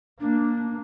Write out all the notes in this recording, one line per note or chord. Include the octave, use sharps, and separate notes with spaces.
A#3 D4